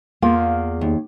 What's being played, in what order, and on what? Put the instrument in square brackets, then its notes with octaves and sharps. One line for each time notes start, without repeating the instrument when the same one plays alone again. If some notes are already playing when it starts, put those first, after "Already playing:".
[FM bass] E2 [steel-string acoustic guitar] A#3 [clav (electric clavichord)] F4
[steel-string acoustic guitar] D#2